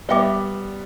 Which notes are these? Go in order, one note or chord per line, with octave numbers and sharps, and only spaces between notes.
G3 B3 B4 E5 G5 D6